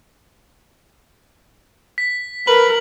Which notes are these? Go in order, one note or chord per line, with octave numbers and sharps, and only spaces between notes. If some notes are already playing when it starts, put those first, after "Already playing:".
B6
A#4 B4 F#7